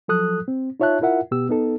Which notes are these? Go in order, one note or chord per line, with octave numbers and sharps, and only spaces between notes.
F3 F#3 A4 D#6 F#6
C4
D#4 F4 C#5 E5 A5 F#6
E4 F4 A#4 E5 F#5
B2 B3 G4 E6
B3 D#4 A4